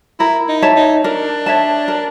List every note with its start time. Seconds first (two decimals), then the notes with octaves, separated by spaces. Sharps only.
0.19 E4 A#4
0.48 D#4
0.62 C#5 E5 A5
0.76 D#4
1.04 D4 A#4
1.46 C#5 E5 A5
1.88 A#4